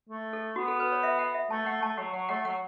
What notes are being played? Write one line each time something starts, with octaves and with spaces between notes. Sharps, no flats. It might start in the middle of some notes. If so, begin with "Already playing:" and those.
A3
A4
B3 F#4
A4
B4
C#5
E5
F#5
E5
A3 A5
A3 F#5
A3 A5
F#3 F#5
F#3 F#5
A3 F#5
F#3 F#5